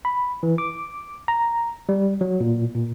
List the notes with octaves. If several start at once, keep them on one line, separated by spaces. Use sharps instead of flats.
B5
E3
D6
A#5
G3
F#3
A#2
A#2